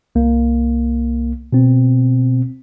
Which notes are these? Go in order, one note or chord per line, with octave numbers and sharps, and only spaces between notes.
C2 A#3
B2 C4